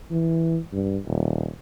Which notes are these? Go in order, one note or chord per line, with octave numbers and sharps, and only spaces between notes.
E3
G2
D#1